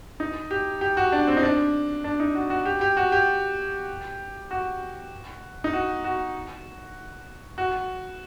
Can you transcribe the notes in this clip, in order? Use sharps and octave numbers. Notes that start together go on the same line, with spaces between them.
D#4
G4
G4
F#4
D4
C4
D#4
D4
D4
D#4
F#4
F#4
G4
G4
F#4
G4
F#4
D#4
F#4
F#4
F#4